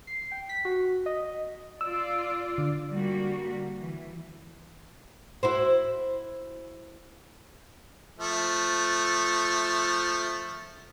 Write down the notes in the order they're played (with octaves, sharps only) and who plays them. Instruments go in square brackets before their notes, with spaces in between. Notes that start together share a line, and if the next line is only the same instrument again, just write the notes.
[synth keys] C7
G5
B6
F#4
D#5
[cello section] F4 D5 [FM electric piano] E6
[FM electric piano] D3
[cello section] G3 A#3 F#4
E3
[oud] E4 F#4 C5
[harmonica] F3 A3